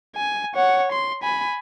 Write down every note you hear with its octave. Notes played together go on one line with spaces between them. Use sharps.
G#5
C#5 F#5
C6
G#5 B5